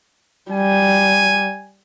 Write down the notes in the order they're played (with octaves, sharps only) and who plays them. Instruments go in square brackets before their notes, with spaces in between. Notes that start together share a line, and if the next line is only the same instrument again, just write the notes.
[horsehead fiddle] G3 [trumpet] G#5